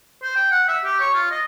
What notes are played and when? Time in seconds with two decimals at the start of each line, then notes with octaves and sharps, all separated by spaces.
0.23 C5
0.36 G5
0.51 F#5
0.68 E5
0.85 G4
1.00 C#5
1.14 F4
1.31 D#5